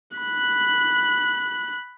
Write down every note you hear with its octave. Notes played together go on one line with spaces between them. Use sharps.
B5 F#6